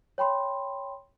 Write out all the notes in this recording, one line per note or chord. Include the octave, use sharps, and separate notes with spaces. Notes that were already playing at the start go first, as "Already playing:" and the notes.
C#5 G5 B5 C6